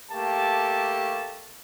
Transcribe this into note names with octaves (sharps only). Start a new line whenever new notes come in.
A3 A#3 G4 A5